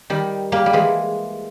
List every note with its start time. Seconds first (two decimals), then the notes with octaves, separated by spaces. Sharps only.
0.10 D#3 G3
0.52 G3 A#3
0.66 G3
0.73 E3 G#3